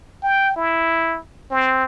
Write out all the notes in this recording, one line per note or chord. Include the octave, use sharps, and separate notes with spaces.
G5
E4
C4